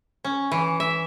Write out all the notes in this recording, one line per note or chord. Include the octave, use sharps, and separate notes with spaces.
C#4
E3
E5